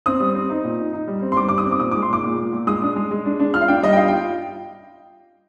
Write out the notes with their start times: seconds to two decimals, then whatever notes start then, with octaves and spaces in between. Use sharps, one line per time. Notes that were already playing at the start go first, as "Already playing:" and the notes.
0.06 C4 D#6
0.20 G3
0.35 C4
0.50 D#4
0.65 A#2
0.79 D#4
0.93 D#4
1.07 G3
1.22 C4
1.32 C6
1.36 G3 D6
1.49 G3 D6
1.58 D#6
1.66 C4
1.72 D6
1.80 A#2 D#6
1.91 G#3 D6
2.02 C6
2.09 A#2 D6
2.24 A#2
2.38 A#2
2.53 A#2
2.67 G#3 D#6
2.82 D4
2.96 G#3
3.11 G#3
3.25 D4
3.39 D4
3.54 F4 F6
3.61 F5
3.68 D4 G5
3.82 G3 D#5
3.93 G5
3.97 F4 F5
4.08 F4 G5